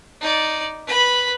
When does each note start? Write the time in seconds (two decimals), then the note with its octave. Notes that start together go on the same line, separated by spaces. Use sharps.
0.21 D#4 D5
0.87 B4 B5